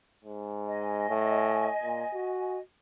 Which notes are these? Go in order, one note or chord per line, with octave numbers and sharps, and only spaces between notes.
G#2
D#5 G#5
A2
A#2
F#4